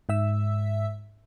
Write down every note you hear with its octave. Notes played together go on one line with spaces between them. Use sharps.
G#2 E5 E6